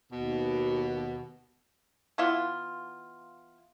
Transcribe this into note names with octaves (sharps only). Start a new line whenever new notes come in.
D#2 B2
E3 B3 E4 F4